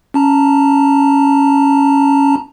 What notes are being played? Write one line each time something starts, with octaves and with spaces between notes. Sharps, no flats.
C#4 A5 A#5